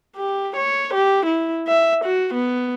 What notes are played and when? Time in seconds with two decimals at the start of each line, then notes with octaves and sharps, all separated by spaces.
0.16 G4
0.57 C#5
0.94 G4
1.26 E4
1.67 E5
2.05 F#4
2.35 B3